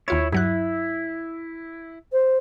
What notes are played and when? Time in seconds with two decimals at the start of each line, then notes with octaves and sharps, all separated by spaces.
0.08 D#2 E4 F4 C#5 G#6
0.32 G2 F#3 E4 F#6
2.12 C5